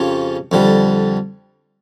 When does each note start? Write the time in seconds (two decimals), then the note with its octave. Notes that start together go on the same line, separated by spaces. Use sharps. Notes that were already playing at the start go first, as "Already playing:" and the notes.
Already playing: F2 C#3 F3 C#4 G4
0.52 F2 D3 G3